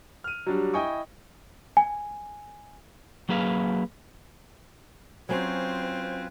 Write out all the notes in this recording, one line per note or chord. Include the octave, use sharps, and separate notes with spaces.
F6 D#7
F#3 G3 D4
E4 D#5 G5 G#5 C#6 D#6
G#5
F#3 A#3 G#4 B4 F5
F#3 C4 C#4 F4 B4 C5 G#5